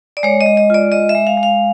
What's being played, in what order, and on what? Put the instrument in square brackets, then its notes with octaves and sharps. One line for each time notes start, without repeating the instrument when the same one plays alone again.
[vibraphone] D5
G#3 C#5
D#5
G#3
D#5
F4 D5
G#3 D#5
E5
G#3
F5
G#3
F5